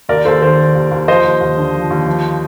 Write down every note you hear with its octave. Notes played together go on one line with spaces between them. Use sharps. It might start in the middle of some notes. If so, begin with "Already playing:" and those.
D#2 A#4 D5
D#2 A4 C5
D#3 A4 C5
D#3
D#2
D#2
F3 C5 D#5
D#2
D#2
D3
F3
D#2
F3